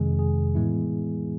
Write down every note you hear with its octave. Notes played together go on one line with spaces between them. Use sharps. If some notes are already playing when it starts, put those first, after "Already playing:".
Already playing: F2 C3 D#3 G#3 G#4
G#4
A2 E3 G#3 B3 E4